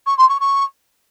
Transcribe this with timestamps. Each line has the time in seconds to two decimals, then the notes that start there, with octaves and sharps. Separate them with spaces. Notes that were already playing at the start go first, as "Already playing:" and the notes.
0.06 C#6
0.18 C6
0.29 C#6
0.40 C#6